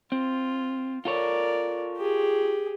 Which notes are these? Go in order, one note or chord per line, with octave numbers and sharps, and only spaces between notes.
C4 F4
F4 A4 A#4 C#5 D5
G4 G#4